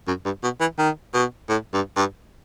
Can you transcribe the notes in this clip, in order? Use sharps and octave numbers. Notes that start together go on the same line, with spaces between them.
F#2
G2
B2
E3
D#3
B2
A2
G2
G2